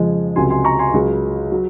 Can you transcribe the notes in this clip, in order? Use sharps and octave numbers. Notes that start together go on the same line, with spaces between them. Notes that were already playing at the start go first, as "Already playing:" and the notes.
Already playing: F2 C#3 F3 G#3 G#5
C#2 C3 F#3 G#5 C6
G#5 C6
A#5 C#6
G#5 C6
C#2 C#3 F#3
F#3